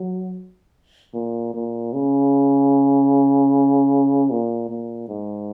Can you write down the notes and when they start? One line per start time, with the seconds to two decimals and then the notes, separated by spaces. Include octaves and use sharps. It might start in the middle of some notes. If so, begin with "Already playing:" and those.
Already playing: F#3
1.14 A#2
1.54 A#2
1.93 C#3
4.30 A#2
4.69 A#2
5.08 G#2